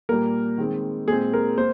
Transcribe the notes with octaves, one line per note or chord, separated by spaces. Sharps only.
A#2 G3 A#3 A#4
D#3 G#3 C4
A#2 G#3 C4 G#4
A#4
A#3 C5